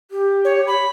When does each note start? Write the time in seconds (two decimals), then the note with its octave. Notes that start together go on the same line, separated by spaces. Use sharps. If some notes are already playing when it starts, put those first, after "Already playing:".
0.11 G4
0.45 C#5
0.67 B5